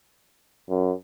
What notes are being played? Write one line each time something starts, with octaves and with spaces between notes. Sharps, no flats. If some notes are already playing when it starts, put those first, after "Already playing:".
F#2